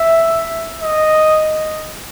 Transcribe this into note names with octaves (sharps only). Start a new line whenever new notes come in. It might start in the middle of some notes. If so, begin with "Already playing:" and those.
Already playing: E5
D#5